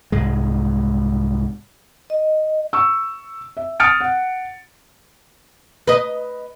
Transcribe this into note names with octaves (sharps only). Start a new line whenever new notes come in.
C2 G#2 G#3
D#5
C#6 E6
E5
D#6 F6 A6 C#7 D7
F#5
B4 D#5